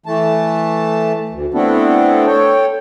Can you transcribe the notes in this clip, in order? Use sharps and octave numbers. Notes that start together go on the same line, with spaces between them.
E3 A3 A5
D2
A3 B3 C4 D4 E4 A4
A4 C#5 G5